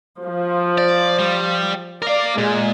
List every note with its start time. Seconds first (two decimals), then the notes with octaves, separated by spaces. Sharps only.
0.23 F3
0.78 D5
1.19 G3
2.02 A#4 D5 F5
2.38 A#2 G#3